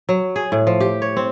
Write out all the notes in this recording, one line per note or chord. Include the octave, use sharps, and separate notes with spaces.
F#3
G#4
A2
F3
G4
C#5
C4